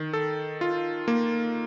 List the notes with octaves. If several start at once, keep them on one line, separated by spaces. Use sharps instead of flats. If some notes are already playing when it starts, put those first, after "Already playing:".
Already playing: D#3
A4
F4
A#3